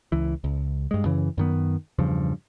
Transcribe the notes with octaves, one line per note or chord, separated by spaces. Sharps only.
C#2 E3
C#2
G2 G#3
F#2 C#3 E3
F#2 D#3 B3
E2 G2 C#3 F3